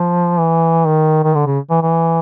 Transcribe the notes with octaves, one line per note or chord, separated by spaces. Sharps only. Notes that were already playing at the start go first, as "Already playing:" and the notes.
Already playing: F3
E3
D#3
D#3
D3
C#3
E3
E3